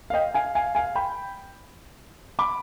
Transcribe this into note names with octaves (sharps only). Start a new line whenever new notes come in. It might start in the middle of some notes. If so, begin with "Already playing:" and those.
F5
D#5 G5
F5 G#5
F5 G#5
F5 G#5
G5 B5
B5 D6